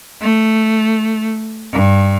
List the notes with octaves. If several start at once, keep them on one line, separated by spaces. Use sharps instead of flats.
A3
G2